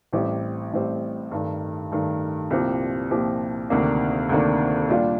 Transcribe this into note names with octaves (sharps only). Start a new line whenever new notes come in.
A1 A2 G3 C4 G4
A1 A2 G3 C4 G4
G2 D#3 A3
G2 D#3 A3
C2 A#2 F3 C4 G4
C2 A#2 F3 C4 G4
D2 C3 D#3 A#3 D4
D2 C3 D#3 A#3 D4
A#2 G3 D4 F4